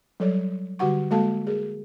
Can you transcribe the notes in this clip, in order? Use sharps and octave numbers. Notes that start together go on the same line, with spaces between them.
F#3 G3 A4 C#5 D5
D3 G3 F#4 G4 F#5 C#6
G#3 A#3 F#4 A4 F5 A5
G#4 A#4